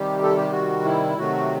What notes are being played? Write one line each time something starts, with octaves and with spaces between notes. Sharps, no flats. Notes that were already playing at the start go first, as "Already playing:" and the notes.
Already playing: C3 D#3 G3 G4
A4
G4
F#4
E4
C3 D#3 F#3 A3 F#4